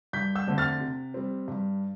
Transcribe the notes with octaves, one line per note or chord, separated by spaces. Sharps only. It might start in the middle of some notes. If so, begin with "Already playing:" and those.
G2 G6 B6
E6 G6
D3 A3 C4
F6 A6
C3
G3 C4
G2